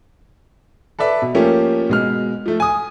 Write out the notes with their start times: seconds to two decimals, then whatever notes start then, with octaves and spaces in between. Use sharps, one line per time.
0.99 A4 B4 D5 E5
1.22 B2
1.35 F3 A3 A#3 C#4 G4
1.89 B2 G#3 F6
2.46 F3 A3
2.60 G#5 D#6